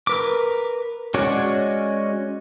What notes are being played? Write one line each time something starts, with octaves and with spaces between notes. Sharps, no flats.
A#4 B4 D6
G#3 C#4 F#4 C#5 D5